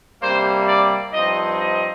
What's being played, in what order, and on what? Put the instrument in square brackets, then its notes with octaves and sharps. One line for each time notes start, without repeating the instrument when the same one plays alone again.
[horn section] C3 G3 A#3 C5
D5
G2 F3 C4 D#4 D#5
D#5